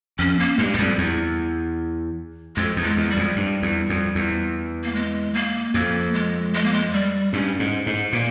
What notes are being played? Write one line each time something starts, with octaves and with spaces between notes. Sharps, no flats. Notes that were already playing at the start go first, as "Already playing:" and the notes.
F2 C#4
A#3
G2 G#3
E2 G#3
F2 G3
E2
F2 G#3
E2
G#3
E2
G3
F2
G2
E2
F2
E2
A#3
G#3
A#3
F2 A#3
G#3
G#3
A#3
G#3
G3
G2 C#4
G#2
G#2
A#2 A#3